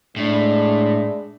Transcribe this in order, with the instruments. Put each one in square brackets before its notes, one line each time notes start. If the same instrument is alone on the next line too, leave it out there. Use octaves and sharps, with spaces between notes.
[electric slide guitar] A2 [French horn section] G#3 D4